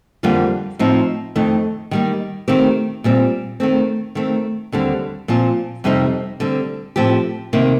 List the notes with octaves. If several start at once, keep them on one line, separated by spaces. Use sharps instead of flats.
F2 D3 G3 A#3 F4
A2 F3 C4 D#4
F2 D#3 A3 D#4
D#3 G3 A#3
D#3 A3 C4 G4
A#2 G3 C4
D#3 A3 C4
D#3 A3 C4
D#2 D3 G3 C4
A#2 F3 C4 F4
F2 C3 G3 C4 D#4
D3 G3 C4
A2 F3 C4 G4
C3 D#3 A#3